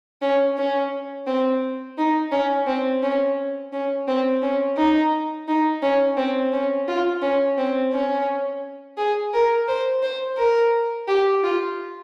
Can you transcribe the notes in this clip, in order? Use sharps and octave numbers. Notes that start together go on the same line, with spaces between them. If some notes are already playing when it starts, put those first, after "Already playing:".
C#4
C#4
C4
D#4
C#4
C4
C#4
C#4
C4
C#4
D#4
D#4
C#4
C4
C#4
F4
C#4
C4
C#4
G#4
A#4
C5
C5
A#4
G4
F4